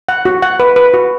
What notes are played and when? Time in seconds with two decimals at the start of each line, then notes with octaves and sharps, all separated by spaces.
0.09 F#5
0.25 F#4
0.42 F#5
0.60 B4
0.76 B4
0.94 F#4